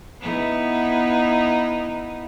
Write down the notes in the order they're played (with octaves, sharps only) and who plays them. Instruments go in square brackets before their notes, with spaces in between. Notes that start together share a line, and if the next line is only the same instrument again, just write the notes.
[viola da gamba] B3 D#4 E4